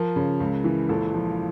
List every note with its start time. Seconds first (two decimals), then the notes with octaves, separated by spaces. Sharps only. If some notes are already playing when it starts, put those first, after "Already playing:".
Already playing: F3 A#4
0.16 C#3
0.40 C#2
0.64 E3
0.89 A#1 A4
1.14 F3